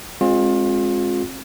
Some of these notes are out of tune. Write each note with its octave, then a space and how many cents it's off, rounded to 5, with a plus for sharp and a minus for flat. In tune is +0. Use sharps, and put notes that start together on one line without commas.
G#3 +0 C4 +35 F4 +30